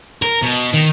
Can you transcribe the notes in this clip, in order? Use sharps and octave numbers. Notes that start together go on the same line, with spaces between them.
A#4
B2
D#3